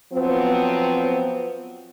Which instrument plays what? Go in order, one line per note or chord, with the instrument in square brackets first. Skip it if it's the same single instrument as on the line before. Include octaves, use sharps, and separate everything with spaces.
[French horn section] F3 F#3 B3 C4